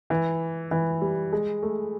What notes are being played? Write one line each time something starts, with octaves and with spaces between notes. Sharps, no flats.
E3
E3
G3
G#3
A3